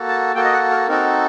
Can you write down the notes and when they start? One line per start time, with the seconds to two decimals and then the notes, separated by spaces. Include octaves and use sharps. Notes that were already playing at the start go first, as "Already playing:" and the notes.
Already playing: A#3 F#4 A4
0.08 A5
0.35 A#3 F#4 A4 G5
0.44 D#5
0.53 F#5
0.71 A#4
0.88 C4 D#4 F#4 A4 A#4